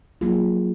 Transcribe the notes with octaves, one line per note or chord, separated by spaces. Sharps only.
F#3 A#3 F4 G#4